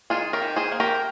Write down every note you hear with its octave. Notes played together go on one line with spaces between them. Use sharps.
D#3 F4 G#4
G4 A#4
D#3
G#4 C5
A#3
G4 A#4